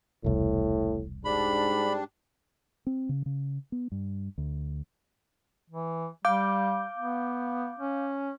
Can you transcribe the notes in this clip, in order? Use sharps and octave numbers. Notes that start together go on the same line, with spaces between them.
E1 C2 A2
G#2 G3 D4 B5
C4
C#3
C#3
B3
G2
D2
E3
G3 F5 D6 G6
B3
C#4